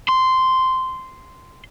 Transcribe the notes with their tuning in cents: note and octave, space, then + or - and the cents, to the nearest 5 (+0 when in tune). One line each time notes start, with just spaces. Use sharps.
C6 -10